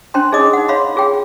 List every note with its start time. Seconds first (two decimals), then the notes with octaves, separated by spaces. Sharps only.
0.14 C#4 D4 C5 G5 C6
0.32 D#4 G#4 C#5 D#5 D6 D#6
0.53 D#4 F#5
0.68 C#5 F5 B5 C6
0.96 F4 G#4 C#5 G5